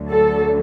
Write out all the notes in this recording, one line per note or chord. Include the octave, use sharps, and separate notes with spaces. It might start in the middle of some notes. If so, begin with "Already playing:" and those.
Already playing: D2 D3 F#3
A4